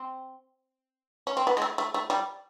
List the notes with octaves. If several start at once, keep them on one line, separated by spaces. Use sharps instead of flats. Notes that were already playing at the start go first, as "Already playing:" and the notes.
Already playing: C4
C#4
C4
B3
G#3
A3
A3
A3
G3